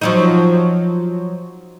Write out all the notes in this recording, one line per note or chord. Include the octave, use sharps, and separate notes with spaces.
F3 F#3 D#4